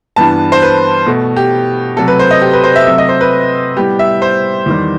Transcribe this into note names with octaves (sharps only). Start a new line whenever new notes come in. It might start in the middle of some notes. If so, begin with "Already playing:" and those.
G2 E3 G3 B3 A5
C5
B4
B2 A3
G4
C3 F#3 A3 A4
B4
C5
D#5
G4
B4
C5
E5
C3 F#3 A3 E5
D#5
C5
B4
A2 G3 B3 G4
E5
C5
E2 D#3 G3